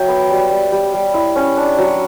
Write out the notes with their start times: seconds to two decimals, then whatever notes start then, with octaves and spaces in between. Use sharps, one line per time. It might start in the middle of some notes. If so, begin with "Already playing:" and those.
Already playing: F#3 E5 G5
0.08 B3
0.30 G3
0.51 G3
0.72 G3
0.94 G3
1.14 E4
1.36 C#4
1.57 D4
1.78 F#3